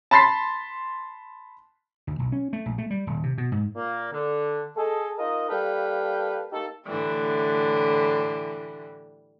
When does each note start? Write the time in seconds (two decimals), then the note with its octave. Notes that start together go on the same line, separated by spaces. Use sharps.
0.11 A5 B5 C6 A6 B6 C7
2.07 D2
2.19 B1
2.32 C#4
2.53 A3
2.66 A#1
2.78 A3
2.90 G3
3.07 D#1
3.23 C3
3.38 B2
3.52 G#2
3.75 A#2 A#3
4.12 D3
4.77 G#4 A4 D#5
5.18 D#4 F4 A#4 D#5
5.49 G3 A#3 A4 B4 F5 G5
6.52 A#3 D#4 G4 A4
6.87 A2 D3 E3 G3